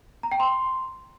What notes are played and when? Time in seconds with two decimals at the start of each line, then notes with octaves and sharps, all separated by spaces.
0.23 A#5
0.32 G5
0.40 C6